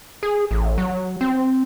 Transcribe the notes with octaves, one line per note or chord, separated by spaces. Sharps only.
G#4
A1
F#3
C4